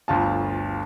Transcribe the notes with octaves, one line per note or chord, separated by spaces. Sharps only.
G1 D2 F4 A5